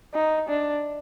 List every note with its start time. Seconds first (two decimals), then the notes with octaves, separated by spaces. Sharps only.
0.14 D#4
0.48 D4